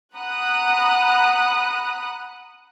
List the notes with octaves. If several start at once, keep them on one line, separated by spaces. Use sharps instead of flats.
F#5 A#5 B5 D#6 F#6